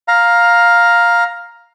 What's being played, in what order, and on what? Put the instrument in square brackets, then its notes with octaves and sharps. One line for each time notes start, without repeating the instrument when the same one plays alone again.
[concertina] F5 A#5